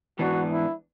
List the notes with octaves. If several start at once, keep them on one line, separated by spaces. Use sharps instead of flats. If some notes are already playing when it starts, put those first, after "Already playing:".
G#2 E3 B3 D4 F#4
E4